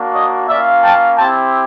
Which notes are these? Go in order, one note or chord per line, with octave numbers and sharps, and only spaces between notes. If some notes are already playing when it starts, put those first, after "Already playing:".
Already playing: A#3 D4 F#4
C#5 D#5
A#3 C#4 F4 D5 E5
G5 A5
C4 E4 G4 G5 A5